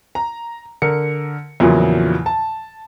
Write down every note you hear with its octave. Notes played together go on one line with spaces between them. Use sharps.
A#5
D3 A#4 C#7
E2 A#2 C#3 F3 F#3
A5